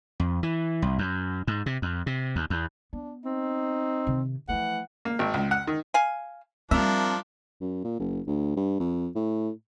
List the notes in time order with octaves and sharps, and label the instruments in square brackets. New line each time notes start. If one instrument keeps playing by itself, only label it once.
[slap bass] F2
E3
C2
F#2
G#2
C3
F2
C3
D#2
E2
[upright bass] B3 [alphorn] D4
[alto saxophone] C4 [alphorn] D#4
[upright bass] C3 D#3
[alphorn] E3 [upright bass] F3 A3 [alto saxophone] F#5
[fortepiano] A#3
G#1
C#2
F#5
D#3
[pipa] F5 G#5
[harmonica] F3 D4 A#4 [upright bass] G3 C4 [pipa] E5
[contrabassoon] F#2
A#2
F#1
D2
G2
F2
A2